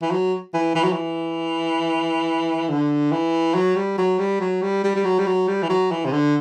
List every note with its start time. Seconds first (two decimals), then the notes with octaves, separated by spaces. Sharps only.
0.02 E3
0.11 F#3
0.54 E3
0.75 E3
0.84 F#3
0.92 E3
2.69 D3
3.12 E3
3.55 F#3
3.76 G3
3.98 F#3
4.19 G3
4.40 F#3
4.62 G3
4.84 G3
4.95 G3
5.05 F#3
5.19 G3
5.26 F#3
5.48 G3
5.63 E3
5.69 F#3
5.91 E3
6.05 C3
6.13 D3